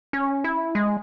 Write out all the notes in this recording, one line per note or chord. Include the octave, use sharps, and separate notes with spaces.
C#4
E4
G#3